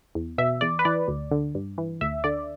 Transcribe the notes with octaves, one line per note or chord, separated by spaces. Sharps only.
E2
B2 E5
E2 D5
B4
E3 D5
D2
D3
G2
E3
D2 E5
D3 D5